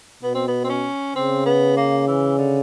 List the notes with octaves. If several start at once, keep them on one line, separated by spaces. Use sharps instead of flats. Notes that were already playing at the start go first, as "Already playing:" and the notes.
B2 B3
C4
B3
C4
C#4
C#3 C4
B3
A#3
E3
D3